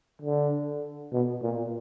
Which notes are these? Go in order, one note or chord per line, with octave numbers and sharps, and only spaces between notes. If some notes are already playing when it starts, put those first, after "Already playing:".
D3
B2
A#2